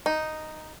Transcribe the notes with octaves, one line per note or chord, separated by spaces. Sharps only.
D#4